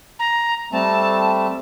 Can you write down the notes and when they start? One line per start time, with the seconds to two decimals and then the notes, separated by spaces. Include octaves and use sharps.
0.19 A#5
0.73 G3 A3 C4 A5